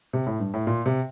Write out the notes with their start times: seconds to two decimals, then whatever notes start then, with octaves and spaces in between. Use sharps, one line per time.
0.13 C3
0.27 A2
0.40 G2
0.54 A2
0.67 A#2
0.86 C3